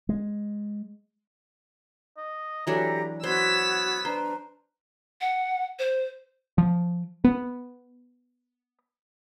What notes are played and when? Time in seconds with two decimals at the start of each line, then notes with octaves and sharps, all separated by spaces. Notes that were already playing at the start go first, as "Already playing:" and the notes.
0.09 G#3
2.17 D#5
2.67 E3 F#3 D4 G4 A4 A#5
3.24 B3 F#4 C5 E6 G#6 B6
4.05 D4 B4 C5 A#5
5.21 F#5
5.79 C5
6.58 F3
7.24 B3